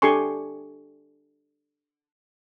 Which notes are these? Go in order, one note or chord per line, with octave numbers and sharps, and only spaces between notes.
D4 G4 A4 G#5 C6 C#6